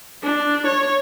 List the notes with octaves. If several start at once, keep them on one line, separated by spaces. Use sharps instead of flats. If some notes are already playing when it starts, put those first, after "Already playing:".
D4
C#5